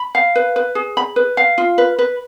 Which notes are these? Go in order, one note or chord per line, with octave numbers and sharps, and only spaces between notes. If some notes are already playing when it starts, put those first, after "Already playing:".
Already playing: B5
F5
B4
B4
G#4
B5
B4
F5
F4
B4
B4